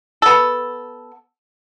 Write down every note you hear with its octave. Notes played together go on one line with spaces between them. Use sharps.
B3 A4